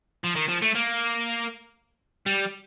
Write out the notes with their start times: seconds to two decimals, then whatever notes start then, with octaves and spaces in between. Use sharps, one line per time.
0.24 F3
0.36 D#3
0.48 F3
0.62 A3
0.75 A#3
2.26 G3